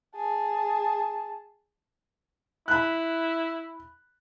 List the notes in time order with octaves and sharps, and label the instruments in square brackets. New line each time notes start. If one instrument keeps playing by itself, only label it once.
[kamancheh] G#4 A5
[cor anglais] E4 [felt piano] B5 F#6